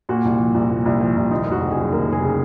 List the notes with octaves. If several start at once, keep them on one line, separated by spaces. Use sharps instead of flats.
A#2 F#4
C2
F3
C2
A#2
C2
F3
C2
D#2 D#4
F1
F#4
C#3
G#4
F#3
D#2 A#4
F1 G#4
C#3